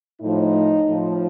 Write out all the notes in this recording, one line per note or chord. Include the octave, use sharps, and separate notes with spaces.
A2 F3 D#4
A2 F3